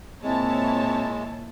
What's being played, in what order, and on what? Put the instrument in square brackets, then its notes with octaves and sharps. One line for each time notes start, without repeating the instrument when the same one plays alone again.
[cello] A#2 [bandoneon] G#3 [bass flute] C4 [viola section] E4 C#5 A5